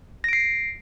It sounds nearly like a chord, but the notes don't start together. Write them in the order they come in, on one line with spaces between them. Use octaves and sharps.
A#6 D7 C7